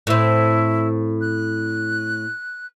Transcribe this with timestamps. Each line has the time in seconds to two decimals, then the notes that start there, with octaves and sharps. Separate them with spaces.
0.07 A2 C4 E4
1.21 F#6